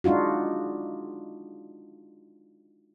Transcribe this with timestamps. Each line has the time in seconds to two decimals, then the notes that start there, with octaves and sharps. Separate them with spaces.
0.04 G#3 D4 D#4 F4 F#4